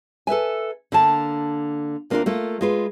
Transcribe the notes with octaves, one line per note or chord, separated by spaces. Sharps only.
A4 B4 E5 G#5
D3 A#3 A5
D2 A#3 C4 D4 F4 A#4
A3 A#3 F4
G#3 F4 B4